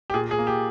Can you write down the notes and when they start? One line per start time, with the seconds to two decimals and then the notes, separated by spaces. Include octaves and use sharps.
0.10 G4
0.14 A#2 G#4
0.31 G#4
0.38 A#3
0.47 G4